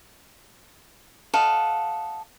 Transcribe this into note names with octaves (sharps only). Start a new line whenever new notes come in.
A4 D#5 F5 F#5